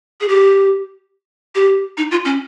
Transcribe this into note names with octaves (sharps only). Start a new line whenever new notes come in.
G#4
G4
G4
D#4
F4
C#4